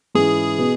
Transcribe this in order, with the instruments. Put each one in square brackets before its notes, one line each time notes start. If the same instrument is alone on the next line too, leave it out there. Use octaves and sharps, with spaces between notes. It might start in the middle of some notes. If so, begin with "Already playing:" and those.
[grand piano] G#2 E3 C#4 E4 [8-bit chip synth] G#4
[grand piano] B2 B3